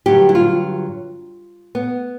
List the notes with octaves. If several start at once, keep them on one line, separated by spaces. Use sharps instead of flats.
G2 D3 F#3 G4
E4
F4
B3